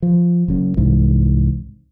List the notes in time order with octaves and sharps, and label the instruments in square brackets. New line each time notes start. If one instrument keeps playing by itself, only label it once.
[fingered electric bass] F3
F#1 F#2
C2 G#2 E3